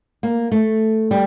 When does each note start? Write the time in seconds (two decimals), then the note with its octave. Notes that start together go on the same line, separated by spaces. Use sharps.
0.23 A#3
0.52 A3
1.11 G3